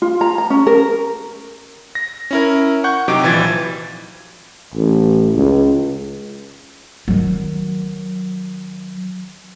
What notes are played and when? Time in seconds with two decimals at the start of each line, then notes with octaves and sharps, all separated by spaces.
0.02 F4
0.21 A#5
0.38 A#5
0.50 C#4
0.67 A#4
1.95 A#6
2.31 C#4 E4 A#4
2.84 F#5 C#6 G6
3.08 C3 F#3 D#4 G5 D6 D7
3.23 A#1 E3 F3 G#6 A6
4.74 A1
5.36 C#2
7.08 D#3 F#3